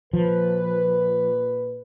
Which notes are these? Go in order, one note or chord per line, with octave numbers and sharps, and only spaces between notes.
A#2 F3 B4